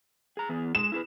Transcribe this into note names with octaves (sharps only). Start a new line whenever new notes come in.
G#4 A#5
E3 B3 G#4
G#3 G#4 E7
E4 G#4 B4